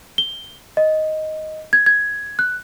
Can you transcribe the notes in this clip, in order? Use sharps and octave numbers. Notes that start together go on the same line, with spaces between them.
G7
D#5
G#6
G#6
F#6